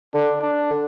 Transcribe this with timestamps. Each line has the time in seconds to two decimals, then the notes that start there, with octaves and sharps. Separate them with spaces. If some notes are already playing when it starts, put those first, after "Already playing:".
0.14 D3 D4
0.41 D4
0.71 D3